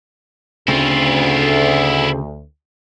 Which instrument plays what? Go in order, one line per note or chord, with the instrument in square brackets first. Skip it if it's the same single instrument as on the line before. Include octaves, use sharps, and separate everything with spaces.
[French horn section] D2 [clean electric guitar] C#3 A3 C4 [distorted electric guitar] E4 F4